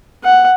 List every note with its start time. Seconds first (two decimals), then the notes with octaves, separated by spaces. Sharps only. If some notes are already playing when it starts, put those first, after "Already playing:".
0.24 F#5